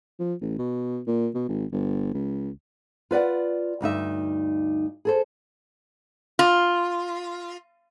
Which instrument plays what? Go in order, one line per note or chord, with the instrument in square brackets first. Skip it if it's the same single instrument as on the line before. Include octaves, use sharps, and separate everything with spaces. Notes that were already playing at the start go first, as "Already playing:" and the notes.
[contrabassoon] F3
A1
B2
A#2
B2
G#1
G1
C#2
[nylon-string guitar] F4 B4 D5 F#5
D2 G2 D#4 E5
G#4 A4 C5
[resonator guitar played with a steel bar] F4